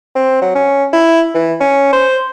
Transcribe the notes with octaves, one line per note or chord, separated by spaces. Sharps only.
C4
F#3
C#4
E4
E3
C#4
C5